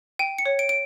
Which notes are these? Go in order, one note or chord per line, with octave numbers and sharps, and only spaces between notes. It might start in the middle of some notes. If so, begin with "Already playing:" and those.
G5 D#7
C#7
C#5
D7
D7